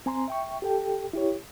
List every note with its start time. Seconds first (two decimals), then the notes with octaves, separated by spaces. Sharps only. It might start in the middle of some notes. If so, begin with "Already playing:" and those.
0.06 C4 G#5 A#5 C6
0.28 E5 G5 C#6
0.62 G4 A4 G5
1.13 E4 G4 C#5